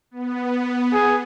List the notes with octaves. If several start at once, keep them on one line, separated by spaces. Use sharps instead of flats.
B3
G#4